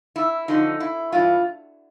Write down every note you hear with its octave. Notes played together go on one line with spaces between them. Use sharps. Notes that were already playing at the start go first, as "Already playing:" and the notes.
E4
F#2 D3 F3 D#4
E4
G2 E3 F4